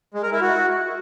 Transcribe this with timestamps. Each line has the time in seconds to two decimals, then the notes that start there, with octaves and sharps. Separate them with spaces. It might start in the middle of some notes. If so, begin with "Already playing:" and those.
0.14 G#3
0.23 A#4
0.32 E4
0.41 F#4